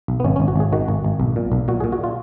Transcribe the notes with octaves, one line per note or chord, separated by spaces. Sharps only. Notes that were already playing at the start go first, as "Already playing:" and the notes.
B1
B3
G#1 C#4
C#4
G#1
F#4
G#1 G#4
D#3 F#4
G#1
G#1
B1
A#2
B1
A#2 F#4
G#4
A#2
F#4
F4